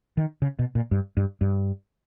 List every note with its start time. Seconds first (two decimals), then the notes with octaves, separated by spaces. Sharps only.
0.17 D#3
0.42 C#3
0.59 B2
0.75 A#2
0.91 G2
1.17 G2
1.41 G2